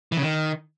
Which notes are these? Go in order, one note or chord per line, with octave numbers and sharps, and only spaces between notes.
E3
C#3
D#3